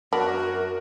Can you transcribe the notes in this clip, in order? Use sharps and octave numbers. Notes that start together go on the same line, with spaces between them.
F#2 B3 D4 F#4 A#4